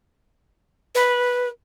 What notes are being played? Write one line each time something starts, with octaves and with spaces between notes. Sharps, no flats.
B4